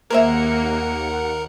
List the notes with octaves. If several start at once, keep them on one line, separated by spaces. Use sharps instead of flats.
D#2 A#3 G#4 A#4 C5 E5 F#5 C#7